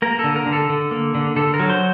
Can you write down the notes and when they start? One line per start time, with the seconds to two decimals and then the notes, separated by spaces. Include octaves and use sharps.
0.02 A#3 A#4
0.19 D3 A4
0.36 A#4
0.46 D3
0.53 A4
0.70 D3
0.91 A#3
1.15 D3
1.36 D3 A4
1.54 A#4
1.60 F#3
1.70 C5